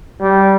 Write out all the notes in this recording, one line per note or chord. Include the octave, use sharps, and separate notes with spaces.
G3